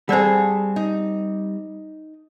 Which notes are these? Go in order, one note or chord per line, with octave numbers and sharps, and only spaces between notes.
G3 C4 G#4 A4 C5 D5 F#5
D#4